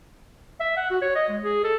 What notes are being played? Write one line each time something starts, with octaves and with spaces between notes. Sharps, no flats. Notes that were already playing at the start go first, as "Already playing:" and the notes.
E5
F#5
F#4
C#5
D#5
G#3
G#4
A4